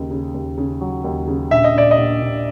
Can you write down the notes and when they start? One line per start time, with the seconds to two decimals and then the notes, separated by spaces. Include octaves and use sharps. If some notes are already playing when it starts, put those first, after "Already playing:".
Already playing: D#2 C#3
0.10 C#3
0.34 D#2
0.58 C#3
0.81 F#3
1.04 D#2
1.27 C#3
1.51 A#1 E5
1.64 D#5
1.74 A#1 D5
1.91 D#5
1.98 A#1
2.21 A#1